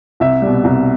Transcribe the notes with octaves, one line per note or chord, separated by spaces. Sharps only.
C2 E5
B2 G3
C2